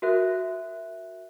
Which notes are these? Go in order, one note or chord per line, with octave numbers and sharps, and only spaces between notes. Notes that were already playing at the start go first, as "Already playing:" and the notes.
F#4 A#4 E5 F#6